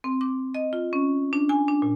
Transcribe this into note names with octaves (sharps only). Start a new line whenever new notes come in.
C4
D6
D#5
F4
C#4
D4
G#5
D4
A#2